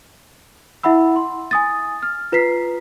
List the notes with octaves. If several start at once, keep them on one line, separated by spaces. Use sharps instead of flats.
E4 E5 F#5 B5 E6
C6
G#5 D#6 A6
F6
F4 B4 A#5 B6 C7